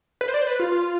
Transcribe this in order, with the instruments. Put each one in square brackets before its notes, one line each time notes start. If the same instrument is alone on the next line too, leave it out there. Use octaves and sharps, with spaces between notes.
[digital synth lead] B4
C5
D5
C5
B4
F4
F4